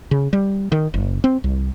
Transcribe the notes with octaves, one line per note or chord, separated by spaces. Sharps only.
C#3
G3
D#3
F#1
C4
C2